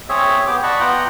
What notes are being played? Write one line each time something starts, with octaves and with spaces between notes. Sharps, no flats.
C4 G#4 C#5 E5
B3 G4 D6
D5 D#5 F#5 A5 B5 C#6
B3 F4 F#5 G5 A#5